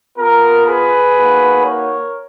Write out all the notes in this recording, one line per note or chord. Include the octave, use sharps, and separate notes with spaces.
B3 F4 A#4
G#4 B4
A#3 D#4 F#4
A#4 C#5